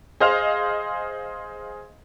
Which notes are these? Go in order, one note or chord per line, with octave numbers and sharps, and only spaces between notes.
G#4 C5 D#5 F5 F6 F7